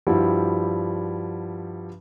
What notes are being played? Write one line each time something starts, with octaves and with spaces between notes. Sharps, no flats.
G2 F3 G3 E4 F#4